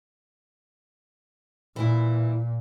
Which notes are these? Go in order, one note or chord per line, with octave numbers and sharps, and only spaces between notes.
A#2 E3 E4